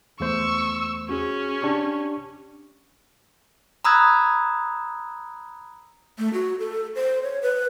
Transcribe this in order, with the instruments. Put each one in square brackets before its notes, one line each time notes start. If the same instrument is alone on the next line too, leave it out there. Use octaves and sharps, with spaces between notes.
[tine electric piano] E2 A3 C5 [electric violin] C#6 E6
[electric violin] C#4 [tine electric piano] F#4 G#4
[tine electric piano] D4 G4 C#6
[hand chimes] A#5 B5 D#6 E6 F#6 G#6
[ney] A3
F#4
A4
C5
C#5
B4